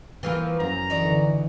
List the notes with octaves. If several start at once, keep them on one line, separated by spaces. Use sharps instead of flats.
E3 F3 A#3
F#2 A#5
D3 E3 D#4 F#4 D5